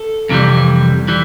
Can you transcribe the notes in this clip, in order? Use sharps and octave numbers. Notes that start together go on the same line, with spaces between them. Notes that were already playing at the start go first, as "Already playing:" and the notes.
Already playing: A4
F2 C3 E3 G3
E3 G3